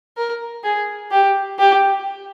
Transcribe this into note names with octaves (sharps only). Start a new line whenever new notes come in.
A#4
G#4
G4
G4